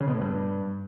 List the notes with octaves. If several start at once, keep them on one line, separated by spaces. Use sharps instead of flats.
C#3
B2
A2
G2